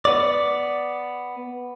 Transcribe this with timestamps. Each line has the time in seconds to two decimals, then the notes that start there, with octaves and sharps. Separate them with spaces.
0.05 B3 D5